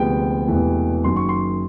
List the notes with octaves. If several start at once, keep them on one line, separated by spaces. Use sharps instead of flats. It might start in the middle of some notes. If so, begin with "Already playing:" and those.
Already playing: D2 C3 F3 G#3 B3 G5
E1 E2 C3 E3 A3
F#1 F#2 D#3 C6
C#6
C6